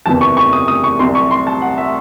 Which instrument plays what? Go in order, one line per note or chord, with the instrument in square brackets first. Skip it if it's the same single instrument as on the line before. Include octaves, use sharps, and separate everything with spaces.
[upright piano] F#1 E2 C3 E3 A5
C#6
C#6
D#6
D#6
C#6
C2 C3 F#3 C6
C#6
C6
A5
F#5
E5